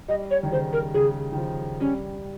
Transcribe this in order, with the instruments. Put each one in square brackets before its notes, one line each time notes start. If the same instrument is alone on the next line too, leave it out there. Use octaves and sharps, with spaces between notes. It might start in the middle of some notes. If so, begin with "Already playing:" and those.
[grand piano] G3 [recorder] D#5
[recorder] C#5
[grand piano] D#3
[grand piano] C#3 [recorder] C5
[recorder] A#4
[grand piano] C#3 [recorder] G#4
[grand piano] D#3
F3
[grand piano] G3 [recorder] C#4